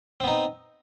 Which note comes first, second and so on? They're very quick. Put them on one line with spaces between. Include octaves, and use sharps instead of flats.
C4 B3 D#4